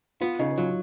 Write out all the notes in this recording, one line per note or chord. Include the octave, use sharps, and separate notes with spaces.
B3 F4
C#3 D#4
F#3 F4